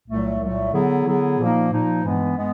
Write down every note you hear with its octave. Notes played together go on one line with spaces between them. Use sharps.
C2 A#2 F#3 A3
C2 A#2 F#3 A3
D3 F#3 B3 E4 G#4
D3 F#3 B3 E4 G#4
A#2 F3 A#3 D#4
A#2 F3 A#3 D#4
G2 E3 G#3 B3
G#3 B3